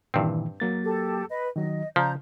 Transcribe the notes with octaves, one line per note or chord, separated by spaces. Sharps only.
G2 A#2 D#3 E3 C4
F#3 A#3 A6
G4 A4
B4 D#5
D#3 F#3 D#5
C#3 F3 D5 A#5 G6